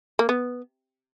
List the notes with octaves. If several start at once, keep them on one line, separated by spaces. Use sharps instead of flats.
A#3
B3